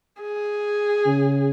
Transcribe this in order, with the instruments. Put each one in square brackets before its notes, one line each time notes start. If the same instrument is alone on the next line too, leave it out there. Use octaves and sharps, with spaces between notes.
[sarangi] G#4
[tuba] C#3